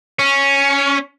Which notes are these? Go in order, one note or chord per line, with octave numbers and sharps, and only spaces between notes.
C#4